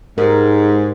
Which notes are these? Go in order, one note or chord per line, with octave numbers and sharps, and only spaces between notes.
G#2 G4 A#4